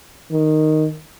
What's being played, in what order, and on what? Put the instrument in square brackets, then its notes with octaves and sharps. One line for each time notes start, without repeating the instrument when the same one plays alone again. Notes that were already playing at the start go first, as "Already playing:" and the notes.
[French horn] D#3